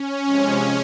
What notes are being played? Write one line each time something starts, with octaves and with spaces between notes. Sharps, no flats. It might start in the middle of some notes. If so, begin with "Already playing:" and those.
Already playing: C#4
C3 F3 G#3